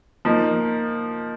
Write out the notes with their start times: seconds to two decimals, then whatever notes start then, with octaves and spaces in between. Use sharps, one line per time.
0.25 F3 A#3 D#4